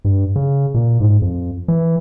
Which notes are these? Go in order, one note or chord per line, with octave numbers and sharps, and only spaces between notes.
G2
C#3
A#2
G#2
F2
E3